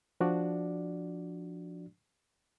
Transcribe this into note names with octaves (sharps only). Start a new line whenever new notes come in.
F3 D4 F#4 D5